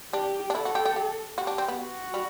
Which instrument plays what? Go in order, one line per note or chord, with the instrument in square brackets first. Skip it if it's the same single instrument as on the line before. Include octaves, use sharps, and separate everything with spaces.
[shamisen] D4 [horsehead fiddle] G4
[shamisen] D4
[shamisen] E4 [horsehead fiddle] A4
[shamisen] F#4
G4
G4
G4
[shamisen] F#4 [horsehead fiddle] G4
[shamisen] D4
C4
B3
[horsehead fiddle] F#4
[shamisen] G3